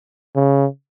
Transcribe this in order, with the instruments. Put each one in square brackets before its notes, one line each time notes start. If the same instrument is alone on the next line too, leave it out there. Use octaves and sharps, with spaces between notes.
[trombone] C#3